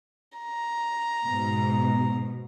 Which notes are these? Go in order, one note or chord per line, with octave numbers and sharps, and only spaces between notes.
A#5
G#2 B2